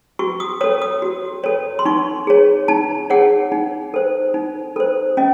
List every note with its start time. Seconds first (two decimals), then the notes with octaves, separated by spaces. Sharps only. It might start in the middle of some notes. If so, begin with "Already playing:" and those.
0.19 F#4 C#6
0.40 D#6
0.61 A4 C#5 D#6
0.82 D#6
1.02 F#4
1.44 A4 C#5
1.79 C6
1.85 D#4 C#6
2.27 G#4 C#5
2.68 D#4 A5
3.10 G#4 C#5 F#5
3.52 D#4
3.94 A4 C5
4.34 D#4
4.76 A4 C5
5.17 C#4 D#5